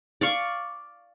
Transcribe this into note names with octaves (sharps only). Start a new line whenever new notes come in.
D5 F5 C#6